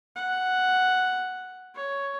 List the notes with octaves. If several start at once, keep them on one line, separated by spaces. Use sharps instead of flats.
F#5
C#5